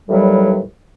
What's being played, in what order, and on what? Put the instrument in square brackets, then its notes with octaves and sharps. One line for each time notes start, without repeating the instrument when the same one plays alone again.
[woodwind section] D#2 A2 E3 F#3 G3